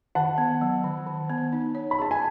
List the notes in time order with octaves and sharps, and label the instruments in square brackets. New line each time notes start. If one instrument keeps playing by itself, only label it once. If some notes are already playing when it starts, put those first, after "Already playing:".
[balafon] D#3 [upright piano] F#5 A5
[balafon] B3
F#3
D#3
D#3
B3
D#4
C#5
[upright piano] B5
[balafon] G#4 [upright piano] A5
[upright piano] G#5